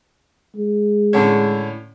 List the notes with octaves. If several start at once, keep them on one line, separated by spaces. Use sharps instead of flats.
G#3
A2 D3 C#4